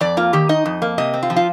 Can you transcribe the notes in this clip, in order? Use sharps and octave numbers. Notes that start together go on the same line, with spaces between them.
F2 D5
A#3 F4
D#3 G4
D#4 D#5
F2
A#3
C3 D#5
C4
F4
F3
F4